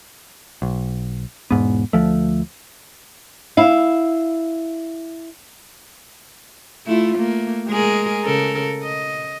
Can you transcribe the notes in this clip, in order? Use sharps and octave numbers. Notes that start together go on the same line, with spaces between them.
B1
E1 G#2 B3
D2 F3 A3
E4 F5
A3 E4 F4
A3 A#3
G#3 G#4 A#4
C#3 A4 A#4
D#5